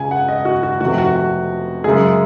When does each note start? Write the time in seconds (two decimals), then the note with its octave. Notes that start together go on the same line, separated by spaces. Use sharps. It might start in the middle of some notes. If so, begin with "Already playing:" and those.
Already playing: C#2 C#3 G#3 G#5
0.11 F#5
0.28 D#5
0.45 F#4
0.63 F#4
0.81 F1 F2 C3 F#4
0.98 F#4
1.16 F#4
1.84 F#2 C#3 G#3 G#4